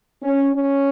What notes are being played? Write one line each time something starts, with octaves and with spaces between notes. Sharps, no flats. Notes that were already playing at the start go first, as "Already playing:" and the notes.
C#4
C#4